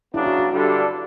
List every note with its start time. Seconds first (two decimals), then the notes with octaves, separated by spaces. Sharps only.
0.14 C#3 F#3 B3 D4 E4
0.26 F#4
0.38 F#4
0.50 G2 D3 G3 D4 E4 A4